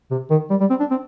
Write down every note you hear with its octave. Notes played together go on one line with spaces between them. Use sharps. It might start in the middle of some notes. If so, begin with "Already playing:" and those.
C3
D#3
G3
G3
C4
D4
C4